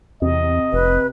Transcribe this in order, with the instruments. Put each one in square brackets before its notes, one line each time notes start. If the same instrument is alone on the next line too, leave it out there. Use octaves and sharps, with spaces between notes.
[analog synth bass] E2 [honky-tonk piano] C3 [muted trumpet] D#5
[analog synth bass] F1 [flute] B4